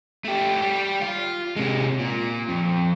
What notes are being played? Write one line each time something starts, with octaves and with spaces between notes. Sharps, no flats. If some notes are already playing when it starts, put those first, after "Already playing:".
A3 G4
G3 G4
F4
C3 G#3
A#2
F2